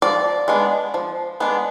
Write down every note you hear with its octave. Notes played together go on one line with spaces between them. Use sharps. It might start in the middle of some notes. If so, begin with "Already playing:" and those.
F3 D5
G#3 B3 D4
F3
G#3 B3 D4